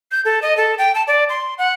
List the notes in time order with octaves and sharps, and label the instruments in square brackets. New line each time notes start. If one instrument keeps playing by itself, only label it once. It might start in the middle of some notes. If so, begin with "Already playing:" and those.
[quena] G6
A4
D#5
A4
G5
A5
D5
C6
F#5